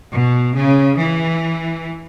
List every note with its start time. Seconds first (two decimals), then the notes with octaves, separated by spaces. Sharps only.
0.11 B2
0.54 C#3
0.97 E3